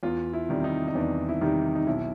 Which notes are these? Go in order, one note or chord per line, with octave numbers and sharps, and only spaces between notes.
E2 F4
E4
C3 D#3 G3
D#4
D#4
E2 D4
E4
C3 D#3 G3 D#4
D#4
B1 E4